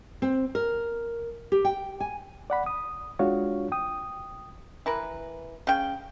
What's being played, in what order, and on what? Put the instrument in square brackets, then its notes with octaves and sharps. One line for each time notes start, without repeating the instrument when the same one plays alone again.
[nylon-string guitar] C4
A#4
G4
G5
G#5
[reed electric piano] D5 F#5 B5
D#6
G#3 D4 F4 F#4 C#5 F5
G5 D#6
[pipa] E3 A#4 B4
C#3 G5